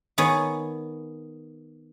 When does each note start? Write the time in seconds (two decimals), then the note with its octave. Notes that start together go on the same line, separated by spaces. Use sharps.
0.18 D#3 B3 G#4 C#5